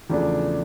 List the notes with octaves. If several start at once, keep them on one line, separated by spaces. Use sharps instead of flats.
E2 C#3 F3 A3 D4